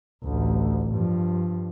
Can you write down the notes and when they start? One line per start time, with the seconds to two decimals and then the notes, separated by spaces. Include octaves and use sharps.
0.24 A1 D2
0.92 G2 F3